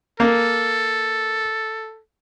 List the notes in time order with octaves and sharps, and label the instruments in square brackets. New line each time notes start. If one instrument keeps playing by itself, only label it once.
[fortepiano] A#3 [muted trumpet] A4